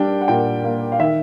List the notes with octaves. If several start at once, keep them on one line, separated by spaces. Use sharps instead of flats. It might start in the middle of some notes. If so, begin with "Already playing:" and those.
Already playing: G3 D4 G5
F#5
A#2 G5
A#3
F5
D#3 E5